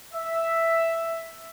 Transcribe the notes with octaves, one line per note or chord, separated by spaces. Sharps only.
E5